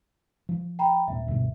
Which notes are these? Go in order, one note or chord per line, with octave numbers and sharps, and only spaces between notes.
F3
G5 A#5 B5
D#1 A#2 C4 E5
D2 G2 B2